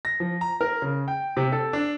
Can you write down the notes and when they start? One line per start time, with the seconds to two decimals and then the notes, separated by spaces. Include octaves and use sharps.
0.05 A#6
0.20 F3
0.41 A#5
0.61 A#4
0.82 C#3
1.08 G5
1.37 C3
1.52 A4
1.73 D4